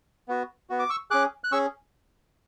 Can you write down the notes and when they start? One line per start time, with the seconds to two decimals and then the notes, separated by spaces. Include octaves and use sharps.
0.28 B3 F#4
0.70 B3 F#4
0.79 D6
0.90 C#6 E6
1.11 C#4 G#4 D6 F#6
1.44 F#6
1.52 C#4 G#4 C#6 E6